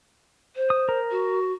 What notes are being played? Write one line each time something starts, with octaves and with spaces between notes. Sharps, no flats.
C5
D#6
A#4
F#4